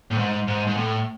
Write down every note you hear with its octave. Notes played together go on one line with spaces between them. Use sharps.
A2
G#2
G#2
G#2
A2